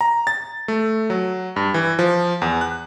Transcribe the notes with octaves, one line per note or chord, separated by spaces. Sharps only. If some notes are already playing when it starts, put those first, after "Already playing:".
A#5
A6
A3
F#3
G2
E3
F3
E2
F#6